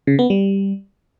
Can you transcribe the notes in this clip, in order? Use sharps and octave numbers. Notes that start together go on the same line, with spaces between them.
C#3
B3
G3